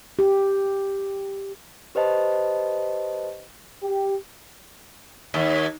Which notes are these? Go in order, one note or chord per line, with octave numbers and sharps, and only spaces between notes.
G4
G4 B4 C5 D#5 A5
G4
D#2